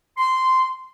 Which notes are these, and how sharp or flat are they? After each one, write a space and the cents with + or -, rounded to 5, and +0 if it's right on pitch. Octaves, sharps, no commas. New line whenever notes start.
C6 -10